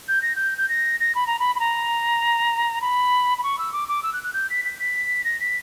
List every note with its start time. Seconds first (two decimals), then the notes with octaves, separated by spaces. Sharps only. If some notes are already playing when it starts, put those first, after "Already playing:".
0.08 G6
0.22 A#6
0.36 G6
0.58 G6
0.69 A#6
1.00 A#6
1.15 B5
1.27 A#5
1.39 B5
1.56 B5
1.60 A#5
2.81 B5
3.38 B5
3.43 C#6
3.59 E6
3.73 D6
3.88 D6
4.03 E6
4.13 F#6
4.24 F#6
4.33 G6
4.50 B6
4.65 B6
4.79 B6
5.25 A#6
5.40 B6